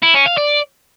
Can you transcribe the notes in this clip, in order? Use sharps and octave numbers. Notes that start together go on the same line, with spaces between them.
E4
C#4
F5
D5